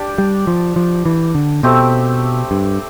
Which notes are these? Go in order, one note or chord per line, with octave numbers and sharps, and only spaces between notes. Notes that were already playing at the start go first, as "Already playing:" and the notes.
Already playing: D4 G4 D5
G3
F3
F3
E3
D3
B2 A3 C4 G4
G2